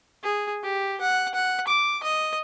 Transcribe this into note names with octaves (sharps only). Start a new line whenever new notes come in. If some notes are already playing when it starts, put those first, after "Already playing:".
G#4
G4
F#5
F#5
D6
D#5